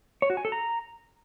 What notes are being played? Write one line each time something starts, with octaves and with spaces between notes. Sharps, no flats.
C#5
F#4
G#5
A4
A#5